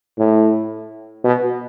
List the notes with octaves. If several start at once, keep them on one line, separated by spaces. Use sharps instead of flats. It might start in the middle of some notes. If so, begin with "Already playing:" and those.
A2
B2